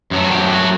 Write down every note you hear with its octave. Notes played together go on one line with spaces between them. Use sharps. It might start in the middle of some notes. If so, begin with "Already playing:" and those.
F#2 F#3 A3
F#4
G4
F#4